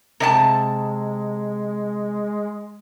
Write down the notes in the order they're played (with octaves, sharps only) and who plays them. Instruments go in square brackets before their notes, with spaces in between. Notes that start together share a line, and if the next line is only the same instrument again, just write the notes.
[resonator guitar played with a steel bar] C3 D5 A5 [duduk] G#3